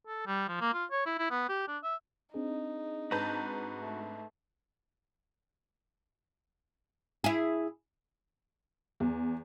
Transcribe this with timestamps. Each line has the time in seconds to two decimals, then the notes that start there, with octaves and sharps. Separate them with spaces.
0.07 A4
0.26 G3
0.48 F3
0.61 A#3
0.74 F4
0.91 C#5
1.06 E4
1.19 E4
1.31 B3
1.49 G4
1.68 D4
1.84 E5
2.34 C4 D4 D#4 G#4
3.11 G#2 F#4 B4 A5 A#5 G6
3.79 A3
7.24 E4 G#4
9.00 E2